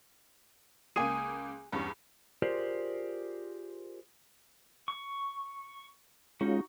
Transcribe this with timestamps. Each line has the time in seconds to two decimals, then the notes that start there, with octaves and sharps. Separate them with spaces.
0.96 C#2 A#3 G#4 G#5 D#7
1.72 E2 G2 C#4
2.42 F4 G4 G#4 A#4 C5 D5
4.88 C#6
6.41 G#3 C#4 D#4 F4 F#4